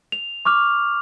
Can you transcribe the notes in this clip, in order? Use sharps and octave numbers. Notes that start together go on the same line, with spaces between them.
F7
C#6 D6 F6 F7